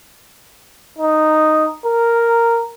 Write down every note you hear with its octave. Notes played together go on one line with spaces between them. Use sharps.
D#4
A#4